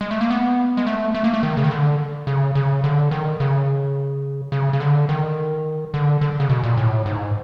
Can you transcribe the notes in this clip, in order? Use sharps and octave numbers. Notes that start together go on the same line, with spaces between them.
G#3
A3
A#3
B3
G#3
A3
A3
A#3
A3
D#3
C#3
D#3
D3
C#3
C#3
D3
D#3
C#3
C#3
C#3
D3
D#3
D3
D3
C#3
B2
A#2
A2
G#2